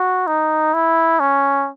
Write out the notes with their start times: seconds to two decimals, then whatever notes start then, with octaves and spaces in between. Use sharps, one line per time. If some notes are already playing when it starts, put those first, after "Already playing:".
Already playing: F#4
0.27 D#4
0.74 E4
1.20 C#4